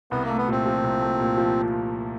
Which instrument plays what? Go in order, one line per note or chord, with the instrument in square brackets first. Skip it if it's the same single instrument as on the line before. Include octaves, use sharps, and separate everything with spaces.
[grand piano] C2 [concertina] B3
[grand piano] A3 [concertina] A#3
[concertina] B3
[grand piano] A#2 [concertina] C4
[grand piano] F3
C2
A3
A#2
F3